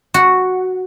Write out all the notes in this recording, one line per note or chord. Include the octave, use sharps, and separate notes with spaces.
F#4